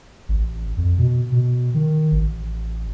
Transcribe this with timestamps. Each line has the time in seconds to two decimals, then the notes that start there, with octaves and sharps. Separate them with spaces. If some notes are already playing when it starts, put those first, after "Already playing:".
0.28 A1
0.77 F2
0.98 B2
1.32 B2
1.74 D#3
2.12 A1